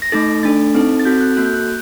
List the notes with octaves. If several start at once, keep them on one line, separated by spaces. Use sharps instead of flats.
A#6
A3 D#4 A4 A6
A3 D4 A4 A6
C4 D#4 A4
A6
C4 F#4 A4 G6
F#6
A#3 F#4 A4 F#6
G6
F#6